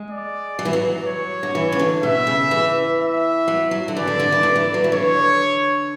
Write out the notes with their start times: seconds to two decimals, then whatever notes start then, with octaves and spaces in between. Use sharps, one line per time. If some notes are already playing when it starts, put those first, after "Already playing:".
Already playing: G#3
0.11 D5
0.59 F#3
0.65 E3
0.73 F#3
1.07 C#5
1.43 D3
1.55 E3
1.72 C#3
1.79 D3
2.03 B2 E5
2.27 C#3
2.51 E3
3.00 E5
3.48 F#3
3.71 F#3
3.88 D3
3.96 E3 D5
4.07 D3
4.19 D3
4.32 E3
4.43 D3
4.56 E3
4.74 F#3
4.84 E3
4.92 D3 C#5